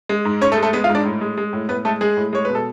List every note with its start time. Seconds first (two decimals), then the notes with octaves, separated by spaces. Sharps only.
0.09 G#3
0.25 G#2
0.41 G#2 C#4 C#5
0.52 A3 A4
0.57 G#3
0.62 A3 A4
0.73 G#3 B3 B4
0.84 F4 F5
0.89 G#2
0.95 D4 D5
1.05 A2
1.21 G#3
1.37 G#3
1.53 A2
1.69 A2 B3 B4
1.85 G#3 A3 A4
2.01 G#3 G#4
2.17 A2
2.33 G#3 C#5
2.45 B2 B4
2.55 A4